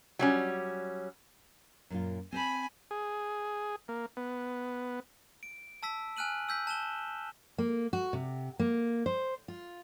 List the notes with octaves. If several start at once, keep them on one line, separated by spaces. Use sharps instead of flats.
F#3 G3 C#4
F#2 A#2 F4
C4 C5 G#5 A5 B5
G#4
A#3
B3
D7
A5 E6 B6
G#5 F6 F#6 D#7 F#7
E6 G6 B6
A5 E7 G7
A#3
F#4
C3
A#3
C5
F4